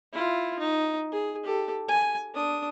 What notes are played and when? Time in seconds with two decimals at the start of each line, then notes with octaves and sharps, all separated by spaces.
0.13 E4 F4
0.59 D#4
1.12 G#4
1.43 G4 A4
1.88 G#5
2.34 D4 D#6